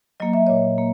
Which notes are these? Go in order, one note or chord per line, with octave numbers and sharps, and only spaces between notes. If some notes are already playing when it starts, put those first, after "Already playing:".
F#3 A#3 D#5
E5
A#2 C#5 D#5
A#3